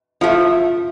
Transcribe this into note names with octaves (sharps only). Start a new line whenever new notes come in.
F3 A3 F4